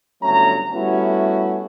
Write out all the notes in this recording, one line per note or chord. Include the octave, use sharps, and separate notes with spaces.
G1 F#3 A3 C#4 A#5
G3 A3 B3 C#4 E4 F#4